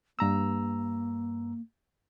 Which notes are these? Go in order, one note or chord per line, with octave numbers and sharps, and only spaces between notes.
G2 A#3 A#5 E6